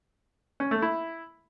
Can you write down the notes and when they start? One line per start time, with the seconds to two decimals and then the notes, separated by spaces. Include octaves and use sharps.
0.60 C#4
0.71 A3
0.82 E4